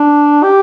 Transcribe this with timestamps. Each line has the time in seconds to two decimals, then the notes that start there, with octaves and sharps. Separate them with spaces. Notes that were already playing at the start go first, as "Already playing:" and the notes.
Already playing: D4
0.43 G4